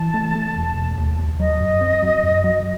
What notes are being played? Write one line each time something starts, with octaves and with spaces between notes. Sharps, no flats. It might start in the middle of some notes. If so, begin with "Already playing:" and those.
Already playing: E3 A5
A3
A3
E1
E1
D#2
D#2
F#3 D#5
F#2
C4
F#3
F#2
F#3